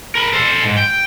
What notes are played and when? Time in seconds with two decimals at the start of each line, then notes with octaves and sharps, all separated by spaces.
0.15 A#4 B5
0.33 A4 C5
0.64 G#2
0.77 G5